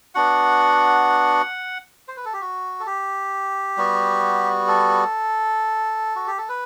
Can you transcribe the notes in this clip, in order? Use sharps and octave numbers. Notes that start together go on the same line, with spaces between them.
B3 D4 F#4 F#5
C5
B4
A4
G4
F#4
A4
G4
G3 B3 F#4
A4
F#4
G4
A4
B4